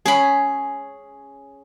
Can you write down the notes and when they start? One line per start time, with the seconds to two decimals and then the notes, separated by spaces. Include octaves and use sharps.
0.05 C#4 G#4 B5